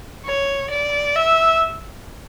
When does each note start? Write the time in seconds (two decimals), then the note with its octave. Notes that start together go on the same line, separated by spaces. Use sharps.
0.25 C#5
0.70 D5
1.16 E5